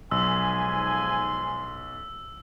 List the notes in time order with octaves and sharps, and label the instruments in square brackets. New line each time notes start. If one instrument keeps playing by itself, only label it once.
[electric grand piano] B1 [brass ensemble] G#2 F3 G#5 [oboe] C6 [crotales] E6